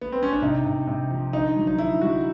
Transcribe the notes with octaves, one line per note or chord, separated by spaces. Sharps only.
B3
C4
C#4
D4
C3 D#4
C3
C3
F3
D3 D#4
F#3
D#4
D3 E4
F#3 F#4